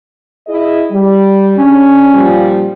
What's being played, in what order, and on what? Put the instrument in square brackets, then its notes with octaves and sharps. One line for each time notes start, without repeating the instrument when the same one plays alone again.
[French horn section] E4 G#4 D#5
G3
[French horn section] C#3 D4 [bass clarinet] C#4
[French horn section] A#2 F3 G3